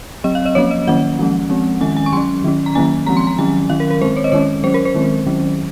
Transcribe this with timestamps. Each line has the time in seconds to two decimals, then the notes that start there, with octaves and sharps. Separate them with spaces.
0.24 F#3 C4 D#5
0.35 F5
0.46 D#5
0.55 F3 A#3 C#4 C#5
0.71 D#5
0.87 D#3 F#3 A#3 C#4 F#5
1.19 F3 G#3 C#4
1.50 F3 G#3 C4
1.81 D#3 G#3 C#4 G#5
1.97 G#5
2.06 C#6
2.13 F#3 C#4 C6
2.44 D#3 F#3 C#4
2.66 A#5
2.75 D#3 F#3 A#3 C#4 G#5
3.06 F3 G#3 C4 A#5
3.17 C6
3.27 A#5
3.38 D#3 F#3 C#4 G#5
3.69 D#3 F#3 C#4 F5
3.80 A#4
3.90 A#4
4.01 D#3 G#3 C4 C5
4.17 C#5
4.24 D#5
4.32 D#3 G#3 C#4 C#5
4.64 F#3 C#4 C5
4.74 A#4
4.85 C5
4.95 D#3 G#3 C4
5.26 D#3 F#3 C#4